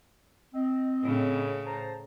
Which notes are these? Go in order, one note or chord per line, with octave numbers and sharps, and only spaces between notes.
C4 D#5
A2 C#3
C5 A5 A#5